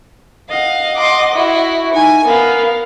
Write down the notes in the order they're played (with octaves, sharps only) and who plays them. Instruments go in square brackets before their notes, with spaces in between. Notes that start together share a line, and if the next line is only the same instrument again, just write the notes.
[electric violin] D#5 F#5 [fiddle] F5
[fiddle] C6 D6
E4 F#4
[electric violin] D#4 [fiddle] G#5
[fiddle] B3 [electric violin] A#4 F5